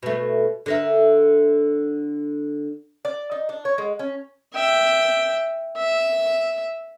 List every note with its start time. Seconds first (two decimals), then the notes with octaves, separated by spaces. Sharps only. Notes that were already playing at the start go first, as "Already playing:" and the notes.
0.03 B2 A3
0.66 D3 A#4 E5
3.05 D5
3.32 D#4
3.49 D4
3.65 C#5
3.78 G#3
3.99 C#4
4.55 E5 G5
5.77 E5